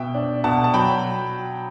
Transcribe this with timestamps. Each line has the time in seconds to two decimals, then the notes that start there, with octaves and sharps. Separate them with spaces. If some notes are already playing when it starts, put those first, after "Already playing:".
Already playing: B2 E5 G5
0.14 D4
0.44 B2 F#5 A5
0.64 A5
0.74 F#3 G5 B5